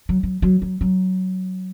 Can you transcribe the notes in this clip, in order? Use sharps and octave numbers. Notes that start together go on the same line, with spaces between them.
F#3
F#3
F#3
F#3
F#3